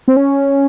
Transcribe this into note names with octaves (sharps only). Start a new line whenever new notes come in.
C4
C#4